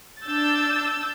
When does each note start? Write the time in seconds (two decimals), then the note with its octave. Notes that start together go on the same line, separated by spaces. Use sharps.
0.24 D4 E6 G6 A6